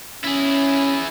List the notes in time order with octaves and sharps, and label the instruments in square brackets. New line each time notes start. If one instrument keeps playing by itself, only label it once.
[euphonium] C#4 [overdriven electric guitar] E4 G#4